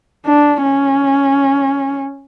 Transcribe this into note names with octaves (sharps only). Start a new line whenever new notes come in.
D4
C#4